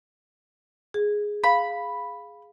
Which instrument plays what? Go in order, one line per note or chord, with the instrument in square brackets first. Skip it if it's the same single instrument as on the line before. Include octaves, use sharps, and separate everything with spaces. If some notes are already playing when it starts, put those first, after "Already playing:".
[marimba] G#4
[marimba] F5 [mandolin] B5